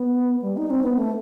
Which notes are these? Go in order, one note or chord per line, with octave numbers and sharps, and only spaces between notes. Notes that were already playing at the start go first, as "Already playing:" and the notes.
Already playing: B3
G3
D#4
C4
B3
A3